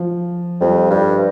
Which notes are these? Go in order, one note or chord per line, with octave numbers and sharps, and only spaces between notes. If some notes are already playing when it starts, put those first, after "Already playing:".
Already playing: F3
F2 G3
G2